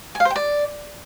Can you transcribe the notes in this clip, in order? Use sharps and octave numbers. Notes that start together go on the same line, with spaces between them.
G#5
F5
C5
G5
D5